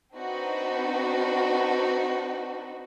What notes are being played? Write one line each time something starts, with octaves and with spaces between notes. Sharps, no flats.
C4 D4 D#4 F#4 B4